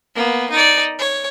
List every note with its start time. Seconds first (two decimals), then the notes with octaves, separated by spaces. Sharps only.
0.15 A#3 B3
0.51 D#4 D5
0.99 C#5